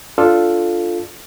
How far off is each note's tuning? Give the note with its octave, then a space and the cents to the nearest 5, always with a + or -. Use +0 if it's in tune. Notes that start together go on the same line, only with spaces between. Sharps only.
D4 +0 F4 +0 A4 +0